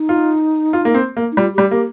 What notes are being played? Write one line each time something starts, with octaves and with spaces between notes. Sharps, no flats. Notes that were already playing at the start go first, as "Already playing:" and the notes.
Already playing: D#4
F4
F4
A#3
C4
A#3
D#4
G3 F4
G3 G4
A#3 G4